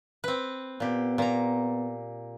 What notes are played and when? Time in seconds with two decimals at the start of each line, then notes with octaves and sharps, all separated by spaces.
0.24 C4 B4
0.80 A#2 B3 G4
1.18 A#2 A#5